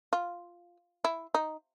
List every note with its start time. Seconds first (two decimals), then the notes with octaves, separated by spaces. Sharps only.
0.13 F4
1.05 E4
1.34 D#4